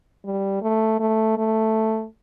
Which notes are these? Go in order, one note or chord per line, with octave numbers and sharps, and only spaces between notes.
G3
A3
A3
A3